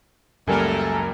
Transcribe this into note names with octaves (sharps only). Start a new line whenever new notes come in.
C#2 F#2 G3 A3 A#3 A4 A#4 G#5